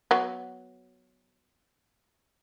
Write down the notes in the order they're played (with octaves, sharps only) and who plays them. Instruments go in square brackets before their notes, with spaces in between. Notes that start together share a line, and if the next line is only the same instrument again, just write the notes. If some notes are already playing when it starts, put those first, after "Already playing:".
[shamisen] F#3 B3